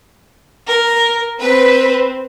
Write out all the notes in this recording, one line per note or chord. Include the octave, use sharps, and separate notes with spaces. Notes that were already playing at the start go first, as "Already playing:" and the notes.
A#4
C4 B4